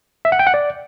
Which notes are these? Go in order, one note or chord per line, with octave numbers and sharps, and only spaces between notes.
E5
F#5
G5
F#5
D5